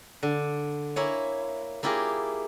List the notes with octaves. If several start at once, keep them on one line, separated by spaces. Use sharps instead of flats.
D3
A#3 E4 C#5 G#5
A#3 E4 F4 G4 G#4 A#4